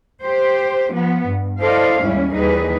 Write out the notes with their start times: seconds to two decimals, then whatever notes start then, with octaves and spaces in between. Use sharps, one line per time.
0.22 G4 C5
0.94 F3 B3
1.27 G2
1.59 E4 A4 C5 D5 D#5 F5
1.99 D#2 G#2 G3 C#4 E4
2.32 D#2 E3 G3 D#4 G#4 B4